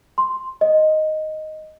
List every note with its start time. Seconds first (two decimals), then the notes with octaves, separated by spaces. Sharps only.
0.18 C6
0.61 D#5